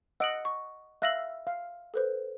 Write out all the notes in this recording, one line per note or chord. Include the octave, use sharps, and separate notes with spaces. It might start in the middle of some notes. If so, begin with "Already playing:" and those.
D#5 F#5 E6 D7 F#7
C#6
E5 F5 F#6 A#6 F#7
F5
A4 B4 C5